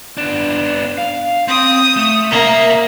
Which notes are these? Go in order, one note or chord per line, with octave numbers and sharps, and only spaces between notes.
B3 D4
F5
C4 D#6
A3
C2 A#3 E5